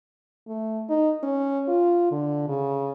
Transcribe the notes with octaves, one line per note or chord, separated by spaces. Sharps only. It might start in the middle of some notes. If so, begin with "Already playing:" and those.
A3
D#4
C#4
F4
D3
C#3